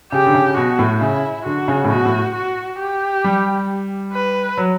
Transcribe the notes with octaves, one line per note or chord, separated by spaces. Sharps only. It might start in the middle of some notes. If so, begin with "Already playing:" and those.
C#3 G4
D3
C#3
B2 F#4
A2
C#3 E4
D3 F#4
C#3
A2
B2 F#4
A2
F#4
G4
G3
B4
F#3